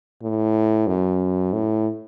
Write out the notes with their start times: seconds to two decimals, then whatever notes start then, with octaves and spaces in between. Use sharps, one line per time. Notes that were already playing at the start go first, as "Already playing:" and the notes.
0.22 A2
0.87 F#2
1.53 A2